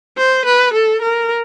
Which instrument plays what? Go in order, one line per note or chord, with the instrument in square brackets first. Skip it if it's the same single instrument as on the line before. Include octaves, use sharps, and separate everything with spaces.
[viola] C5
B4
A4
A#4